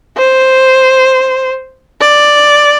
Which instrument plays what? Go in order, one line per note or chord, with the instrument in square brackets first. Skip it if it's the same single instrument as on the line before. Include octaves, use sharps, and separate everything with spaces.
[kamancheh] C5
D5